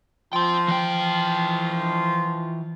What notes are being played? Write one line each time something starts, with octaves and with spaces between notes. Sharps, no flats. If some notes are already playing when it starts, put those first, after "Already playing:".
F3 F4 G5 C6
E3 G5